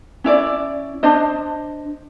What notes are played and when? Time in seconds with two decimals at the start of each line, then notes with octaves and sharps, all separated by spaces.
0.24 C#4 E4 D5
1.03 D4 C5 D#5